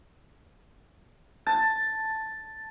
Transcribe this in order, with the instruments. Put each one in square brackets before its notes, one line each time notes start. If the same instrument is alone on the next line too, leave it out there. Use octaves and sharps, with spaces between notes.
[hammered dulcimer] A5